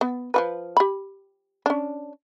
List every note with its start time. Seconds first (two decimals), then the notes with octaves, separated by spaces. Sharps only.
0.01 B3
0.34 F3 F#4 B4
0.77 G4 B5
1.66 C#4 D4